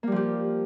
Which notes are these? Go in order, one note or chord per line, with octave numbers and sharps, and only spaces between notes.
F3 G3 A#3 G4